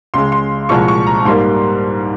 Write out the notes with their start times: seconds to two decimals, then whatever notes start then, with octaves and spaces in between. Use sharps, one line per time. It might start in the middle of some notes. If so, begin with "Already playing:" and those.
0.14 C#2 C#3 G#3 C6
0.32 C6
0.69 C2 A#2 F3 G#3 C#6
0.88 C#6
1.07 A#5
1.25 G#2 G3 A#3 C6